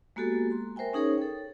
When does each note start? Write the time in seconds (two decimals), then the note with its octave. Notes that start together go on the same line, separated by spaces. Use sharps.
0.16 G#3 A#3 B3 F#4 G4 A4
0.51 A#5 C6
0.76 A#4 C5 E5 G5 G#5
0.93 C#4 D#4 G#4 A#4 C#5
1.18 A4 G5